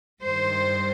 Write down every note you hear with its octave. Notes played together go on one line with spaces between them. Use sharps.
G2 D#3 G3 C5